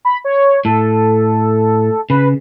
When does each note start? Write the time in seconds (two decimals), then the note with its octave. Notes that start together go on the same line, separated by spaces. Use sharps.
0.05 B5
0.25 C#5
0.65 A2 A4
2.10 C#3 B4